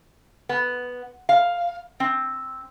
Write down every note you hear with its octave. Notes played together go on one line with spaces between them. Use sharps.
B3
F5
C4